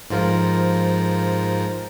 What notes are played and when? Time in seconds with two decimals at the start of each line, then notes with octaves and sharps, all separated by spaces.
0.10 F2 G#2 F3 A#4